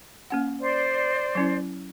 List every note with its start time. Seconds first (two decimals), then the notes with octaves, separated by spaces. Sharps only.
0.30 A#3 C#4 F#5
0.61 C5 D5
1.35 F#3 C#4 E4